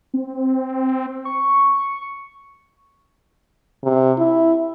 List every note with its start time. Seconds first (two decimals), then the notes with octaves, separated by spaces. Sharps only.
0.14 C4
1.25 C#6
3.84 C3
4.18 E4